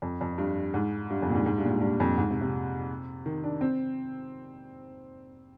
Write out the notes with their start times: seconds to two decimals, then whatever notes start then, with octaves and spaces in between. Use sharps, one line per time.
0.02 F2
0.21 F2
0.38 G2
0.74 G#2
1.10 G2
1.22 F2
1.29 A#2
1.35 G#2
1.46 G#2
1.58 G2
1.65 A#2
1.70 G#2
1.82 G2
2.00 F2
2.18 G#2
2.30 C3
2.41 C3
3.26 D#3
3.44 D4
3.61 C4